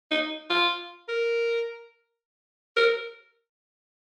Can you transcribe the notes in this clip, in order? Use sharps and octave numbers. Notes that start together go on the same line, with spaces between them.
D#4
F4
A#4
A#4